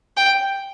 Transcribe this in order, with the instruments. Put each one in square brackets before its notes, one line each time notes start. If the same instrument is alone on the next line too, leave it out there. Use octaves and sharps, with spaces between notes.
[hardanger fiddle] G5